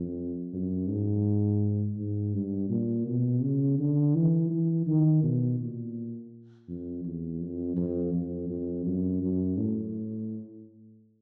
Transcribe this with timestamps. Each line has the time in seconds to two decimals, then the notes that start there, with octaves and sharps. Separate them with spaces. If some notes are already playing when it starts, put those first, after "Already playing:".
Already playing: F2
0.53 F#2
0.89 G#2
1.97 G#2
2.33 G2
2.69 A#2
3.07 B2
3.42 C#3
3.78 D3
4.15 E3
4.50 E3
4.87 D#3
5.23 B2
5.60 A#2
6.68 F2
7.05 E2
7.40 F2
7.76 F2
8.13 F2
8.49 F2
8.86 F#2
9.22 F#2
9.57 A2